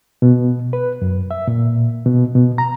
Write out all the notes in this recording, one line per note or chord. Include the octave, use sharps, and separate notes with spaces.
B2
B4
F#2
E5
A#2
B2
B2
A#5